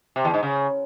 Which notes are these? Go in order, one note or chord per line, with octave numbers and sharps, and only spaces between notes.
C3
E2
G#2
C#3